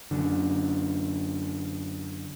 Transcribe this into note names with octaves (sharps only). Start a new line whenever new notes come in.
F#2 D3